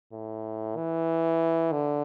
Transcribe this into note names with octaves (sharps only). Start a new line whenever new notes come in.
A2
E3
D3